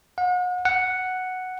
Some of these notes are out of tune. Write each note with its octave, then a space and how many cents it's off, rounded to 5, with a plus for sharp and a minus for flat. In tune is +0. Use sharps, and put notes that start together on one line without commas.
F#5 -40
F#5 +0